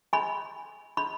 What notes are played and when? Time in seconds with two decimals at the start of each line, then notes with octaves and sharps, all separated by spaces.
0.13 G#5 B5
0.97 B5